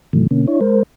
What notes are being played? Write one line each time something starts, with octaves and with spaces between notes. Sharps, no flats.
G#2 C3 D#3 E3 F#3 A3
B2 D3 A#3 C#4
D4 E4 C#5
G#3 A#4 C5